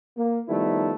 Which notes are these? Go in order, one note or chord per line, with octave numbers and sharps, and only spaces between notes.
A#3
D#3 F3 G3 A3 B3 E4